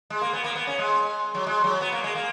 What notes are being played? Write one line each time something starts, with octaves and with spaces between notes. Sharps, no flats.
G#3
A#3
B3
A#3
B3
C#4
G#3
F#3
G#3
F#3
B3
A#3
G#3
A#3